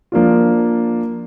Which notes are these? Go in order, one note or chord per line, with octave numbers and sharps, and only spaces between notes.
F3 A#3 D4 F4